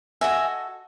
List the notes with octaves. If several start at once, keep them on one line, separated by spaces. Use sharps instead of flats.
F#4 A4 D#5 E5 G#5